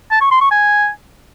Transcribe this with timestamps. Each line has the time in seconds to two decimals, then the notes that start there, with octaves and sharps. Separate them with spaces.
0.11 A5
0.21 C#6
0.31 C6
0.41 C#6
0.51 G#5